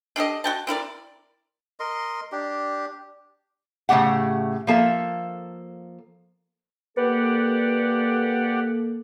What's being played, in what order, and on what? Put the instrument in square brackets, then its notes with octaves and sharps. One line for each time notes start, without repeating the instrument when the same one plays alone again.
[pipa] D4 G4 A4 D#5
F#4 G5 A5
C4 E4 A#4 D5
[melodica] A#4 D#5 C6
D4 G4
[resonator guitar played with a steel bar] A2 C#3 A3 G4 F#5
F3 A#3 A4 E5
[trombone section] A#3 A4 [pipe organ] G4 D5 F#5 [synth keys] B4